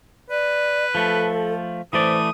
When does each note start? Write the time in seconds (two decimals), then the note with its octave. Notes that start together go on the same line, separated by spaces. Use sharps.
0.30 B4 D5
0.95 F3 A3 A4
1.93 E3 A3 C5 D5 D#6